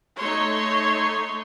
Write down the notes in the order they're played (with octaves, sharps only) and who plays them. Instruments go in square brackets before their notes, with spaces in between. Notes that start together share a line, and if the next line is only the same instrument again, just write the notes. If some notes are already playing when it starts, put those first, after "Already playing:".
[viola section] A3 D#4 C#5 C6